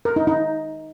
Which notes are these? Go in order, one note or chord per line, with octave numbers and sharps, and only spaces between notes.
A#4
D#4
D#4